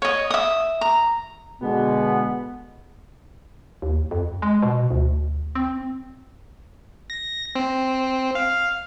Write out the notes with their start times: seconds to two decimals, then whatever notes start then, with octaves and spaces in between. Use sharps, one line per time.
0.02 C#5 D#5
0.31 E5 D#6
0.81 A#5
1.62 B2 D3 G#3 B3
3.82 D#2
4.11 F2
4.42 G#3
4.63 B2
4.90 D2
5.55 C4
7.10 A#6
7.56 C4
8.35 F5